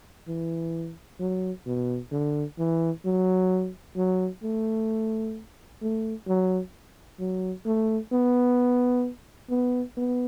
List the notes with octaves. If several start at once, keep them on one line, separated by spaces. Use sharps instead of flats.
E3
F#3
B2
D3
E3
F#3
F#3
A3
A3
F#3
F#3
A3
B3
B3
B3